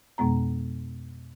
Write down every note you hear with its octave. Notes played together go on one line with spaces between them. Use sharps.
F2 B2 G#3 B3 A#5